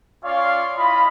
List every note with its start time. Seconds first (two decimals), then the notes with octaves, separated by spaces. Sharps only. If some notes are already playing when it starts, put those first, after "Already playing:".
0.25 C#4 F4 C#5 D5 F5 C6
0.77 E4 F4 D#5 B5